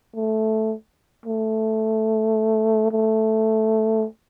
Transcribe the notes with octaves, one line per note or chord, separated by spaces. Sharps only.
A3
A3
A3